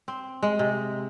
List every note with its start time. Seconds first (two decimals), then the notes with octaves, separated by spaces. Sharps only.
0.08 C4
0.42 G#3
0.59 C3